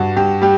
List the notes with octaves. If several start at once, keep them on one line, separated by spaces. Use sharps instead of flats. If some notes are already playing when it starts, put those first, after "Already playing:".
Already playing: G2 F#4
G2 G4
G3 G4